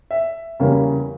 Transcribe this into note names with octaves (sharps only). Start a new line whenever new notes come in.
E5
E2 C#3 G3 A#3 C#4